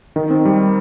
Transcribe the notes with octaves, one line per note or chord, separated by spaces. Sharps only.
D#3
C4
G3